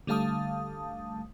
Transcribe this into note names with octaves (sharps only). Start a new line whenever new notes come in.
D3 G3 A3 F5 A5 D#6